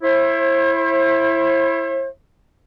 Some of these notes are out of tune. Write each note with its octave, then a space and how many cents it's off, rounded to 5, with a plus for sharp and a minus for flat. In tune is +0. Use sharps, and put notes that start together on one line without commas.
E4 +15 C5 +45